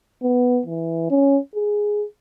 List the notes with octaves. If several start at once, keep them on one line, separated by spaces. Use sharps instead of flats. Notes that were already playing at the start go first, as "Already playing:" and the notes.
B3
E3
C#4
G#4